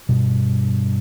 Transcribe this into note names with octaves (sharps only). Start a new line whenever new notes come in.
G2 B2